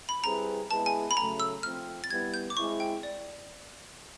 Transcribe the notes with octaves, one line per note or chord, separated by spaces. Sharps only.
B5
G3 C4 E4 G#4 B4 A#5
G#3 B3 E4 G#4 B4 A5
G#5
B5
C#3 F#3 A3 A#5
E6
F3 A3 C4 F6
A6
G3 B3 E4 G#6
G6
D6
G#3 C4 E4 C#6
G5
D5